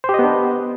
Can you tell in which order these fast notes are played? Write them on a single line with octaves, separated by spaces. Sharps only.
C5 G4 D#5 B3 D4